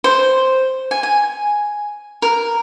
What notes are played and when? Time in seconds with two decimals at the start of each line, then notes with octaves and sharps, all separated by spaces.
0.04 C5
0.91 G#5
1.03 G#5
2.22 A#4